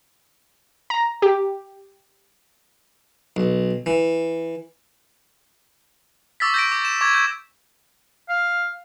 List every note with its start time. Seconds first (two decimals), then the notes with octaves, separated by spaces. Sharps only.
0.90 A#5
1.22 G4
3.36 B1
3.86 E3
6.40 C#6 D6 E6 A6 B6
6.54 G6 A#6 D7
6.72 D6
6.85 E7
7.01 C#6 D6 G#6 A6
7.14 G6 G#6 E7
8.29 F5